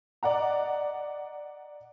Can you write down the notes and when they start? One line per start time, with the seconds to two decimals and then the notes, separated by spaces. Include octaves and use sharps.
0.23 D5 D#5 F#5 A#5